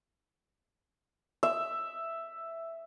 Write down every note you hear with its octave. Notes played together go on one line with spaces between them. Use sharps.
E5